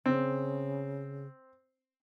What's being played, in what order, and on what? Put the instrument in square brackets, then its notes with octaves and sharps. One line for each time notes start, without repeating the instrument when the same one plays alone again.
[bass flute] C#3 [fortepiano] C4